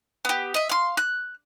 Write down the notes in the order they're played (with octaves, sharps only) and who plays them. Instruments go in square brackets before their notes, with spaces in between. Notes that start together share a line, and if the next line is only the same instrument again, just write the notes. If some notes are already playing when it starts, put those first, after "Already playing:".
[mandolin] B3 G4
D#5 E5
F5 C6
F#6